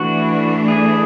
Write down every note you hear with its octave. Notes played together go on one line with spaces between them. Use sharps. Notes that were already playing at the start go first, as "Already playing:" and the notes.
Already playing: E3 A3 D4 F#4
G#4